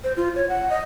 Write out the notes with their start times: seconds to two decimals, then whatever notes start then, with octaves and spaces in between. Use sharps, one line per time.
0.04 C5
0.17 F4
0.35 C#5
0.49 F#5
0.70 D#5